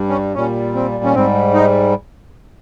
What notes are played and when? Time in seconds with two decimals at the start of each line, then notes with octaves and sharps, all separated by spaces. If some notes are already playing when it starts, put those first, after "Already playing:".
Already playing: G2 G3
0.09 C#4
0.35 A#2 G3 C#4
0.75 C4
1.04 C#4
1.15 G#2 G3 C4
1.54 D#4